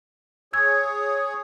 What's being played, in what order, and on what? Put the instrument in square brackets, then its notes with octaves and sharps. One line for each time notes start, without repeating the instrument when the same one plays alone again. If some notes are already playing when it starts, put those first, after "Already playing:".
[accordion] G#4 C#5 [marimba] E6 G#6